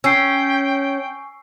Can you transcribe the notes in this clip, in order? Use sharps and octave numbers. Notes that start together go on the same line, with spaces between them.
C#4 G5 G#5 C#6 E6 C7